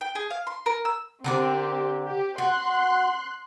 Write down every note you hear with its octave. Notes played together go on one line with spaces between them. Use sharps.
G5
G#4
F5
C6
A#4
E6
D3 C4 G4 A#4 D5
G4
F#4 C6 F#6